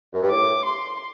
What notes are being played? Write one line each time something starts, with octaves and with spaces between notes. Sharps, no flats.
F#2
G2
A2 D6
C6